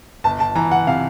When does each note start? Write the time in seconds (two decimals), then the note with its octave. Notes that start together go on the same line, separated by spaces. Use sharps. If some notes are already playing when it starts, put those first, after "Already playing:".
0.24 G1 A5
0.40 A5
0.55 E3 A#5
0.71 F#5
0.87 C3 F5